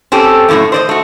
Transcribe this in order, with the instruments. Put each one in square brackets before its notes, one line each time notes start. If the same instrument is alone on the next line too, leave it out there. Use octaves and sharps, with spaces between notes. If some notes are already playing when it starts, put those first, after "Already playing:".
[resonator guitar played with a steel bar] C4 C#4 G4 A4
F#2 A2 C3 G3 A3
C5 D5 D#5
A3 F#4